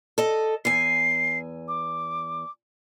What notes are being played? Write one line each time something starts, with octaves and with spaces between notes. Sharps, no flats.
A4 D#5
E2 G#5 C7
D6